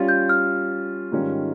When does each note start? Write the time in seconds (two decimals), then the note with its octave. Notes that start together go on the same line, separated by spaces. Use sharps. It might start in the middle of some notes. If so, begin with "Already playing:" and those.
Already playing: G3 C#4 F4
0.09 G6
0.29 F6
1.12 G#2 D#3 G3 C#4 F4